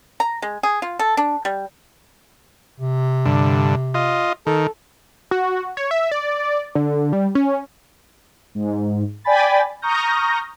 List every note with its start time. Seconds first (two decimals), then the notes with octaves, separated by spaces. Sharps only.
0.20 A#5
0.42 G#3
0.63 G#4
0.82 F4
0.99 A4
1.17 D4
1.45 G3
2.80 C3
3.25 G2 D3
3.94 F4 D#5
4.47 D#3 A4
5.31 F#4
5.77 C#5
5.91 E5
6.11 D5
6.75 D3
7.13 G3
7.35 C#4
8.55 G#2
9.24 D5 G5 G#5 B5 A6
9.82 A#5 C#6 D#6 F6 G6 A#6